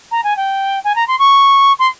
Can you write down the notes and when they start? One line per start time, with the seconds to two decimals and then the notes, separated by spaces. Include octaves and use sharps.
0.11 A#5
0.23 G#5
0.37 G5
0.84 G#5
0.96 A#5
1.08 C6
1.19 C#6
1.79 C6